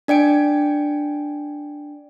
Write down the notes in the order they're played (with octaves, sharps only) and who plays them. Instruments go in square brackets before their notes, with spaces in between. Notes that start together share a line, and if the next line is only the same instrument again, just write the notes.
[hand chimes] D4 D5 G5 D7